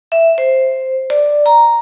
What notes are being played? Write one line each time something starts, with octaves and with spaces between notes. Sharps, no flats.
E5
C5
D5
A#5